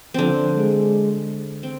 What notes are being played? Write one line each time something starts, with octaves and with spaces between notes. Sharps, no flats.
D3 F3 C4 D4
G#3
C4